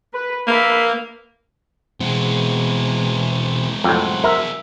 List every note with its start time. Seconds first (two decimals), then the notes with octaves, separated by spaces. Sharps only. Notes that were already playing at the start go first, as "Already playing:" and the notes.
0.13 B4
0.47 A#3 A#4 B4 E5
2.00 B2 E3 G#3 B3 C4
3.84 F2 A2 F#3 C5 F#5
4.24 A#4 E5 A#5